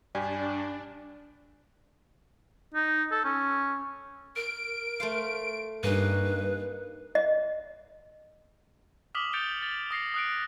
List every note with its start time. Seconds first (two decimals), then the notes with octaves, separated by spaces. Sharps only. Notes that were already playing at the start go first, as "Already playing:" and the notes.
0.15 G2 D4 G4 D5 G#5
2.74 D#4
3.11 A4
3.24 C#4
4.36 A#4 D7
5.00 A3 C5 F5
5.83 G2 A#3 C#4 D#4 B4
7.15 D#5
9.15 D6 D#6 F6 B6 F#7
9.33 G6 A6 C#7 D7 F7 G7
9.62 A6
9.91 D#6 A#6 C7 C#7
10.14 D#6 F#6 D7